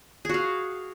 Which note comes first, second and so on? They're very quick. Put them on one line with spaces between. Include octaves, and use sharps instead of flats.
G#4 F#4 F5